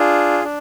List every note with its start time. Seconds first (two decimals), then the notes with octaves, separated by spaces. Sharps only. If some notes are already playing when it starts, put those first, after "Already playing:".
Already playing: D4 F4 G#4
0.44 D4